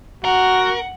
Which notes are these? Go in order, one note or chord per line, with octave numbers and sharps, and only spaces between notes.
F#4 A#4 F#5